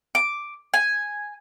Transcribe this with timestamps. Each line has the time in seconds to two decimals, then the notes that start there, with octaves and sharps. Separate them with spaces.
0.15 D6
0.74 G#5